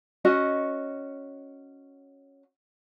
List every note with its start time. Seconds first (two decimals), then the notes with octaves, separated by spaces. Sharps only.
0.25 C#4 F#4 D#5